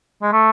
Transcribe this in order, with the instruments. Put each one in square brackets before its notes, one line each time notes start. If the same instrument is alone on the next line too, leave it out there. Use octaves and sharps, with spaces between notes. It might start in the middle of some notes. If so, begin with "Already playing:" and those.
[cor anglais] G#3
A3